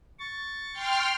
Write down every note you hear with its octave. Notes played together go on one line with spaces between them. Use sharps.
C#6 A6
G5 C6 F6